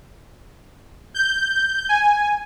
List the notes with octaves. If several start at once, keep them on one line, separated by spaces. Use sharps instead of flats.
G6
G#5